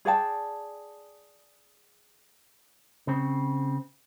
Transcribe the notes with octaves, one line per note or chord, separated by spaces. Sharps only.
G#4 D5 G5 A5
C#3 C4